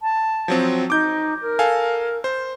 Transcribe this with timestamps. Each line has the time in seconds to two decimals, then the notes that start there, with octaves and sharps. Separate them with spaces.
0.01 A5
0.48 F3 F#3 C4
0.90 D#4 D6 G6
1.41 A#4
1.59 A4 F5 G#5
2.24 C5